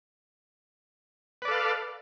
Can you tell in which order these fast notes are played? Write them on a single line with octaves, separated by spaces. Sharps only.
B4 D5 A4 F5